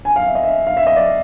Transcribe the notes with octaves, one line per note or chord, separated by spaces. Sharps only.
G#5
F5
E5
D#5
E5
F5
E5
D#5
D5